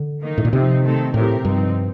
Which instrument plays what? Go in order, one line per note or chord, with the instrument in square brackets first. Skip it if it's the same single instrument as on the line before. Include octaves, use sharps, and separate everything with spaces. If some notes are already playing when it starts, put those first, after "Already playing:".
Already playing: [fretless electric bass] D3
[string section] D#3 A#3 D#4
[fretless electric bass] A2
A#2
[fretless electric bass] C3 [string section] F3 C4 D#4
[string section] D#3 A3 C4 D#4 A4
[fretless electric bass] A2 [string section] C3 F3 C4 G4 A#4
[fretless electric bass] G2 [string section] F3 C4 D#4